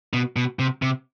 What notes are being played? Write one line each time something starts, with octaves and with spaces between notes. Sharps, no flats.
B2
B2
C3
C3